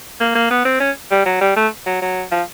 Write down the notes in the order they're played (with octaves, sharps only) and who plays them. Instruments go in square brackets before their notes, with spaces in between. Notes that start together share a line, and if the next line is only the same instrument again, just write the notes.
[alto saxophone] A#3
A#3
B3
C4
C#4
G3
F#3
G3
A3
F#3
F#3
F3